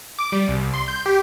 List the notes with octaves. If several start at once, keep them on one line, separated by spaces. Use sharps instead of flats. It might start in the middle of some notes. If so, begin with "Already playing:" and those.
D6
G3
C2
C2
C6
G6
G4